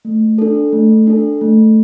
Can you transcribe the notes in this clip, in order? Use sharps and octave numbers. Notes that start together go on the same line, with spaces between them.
A3
D4 A4
A3
D4 A4
A3